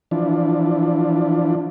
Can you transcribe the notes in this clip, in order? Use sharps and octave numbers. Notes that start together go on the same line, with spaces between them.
E3 F3 D4